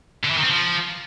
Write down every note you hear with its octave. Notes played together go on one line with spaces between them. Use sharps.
D3
E3
D#3
C4
F3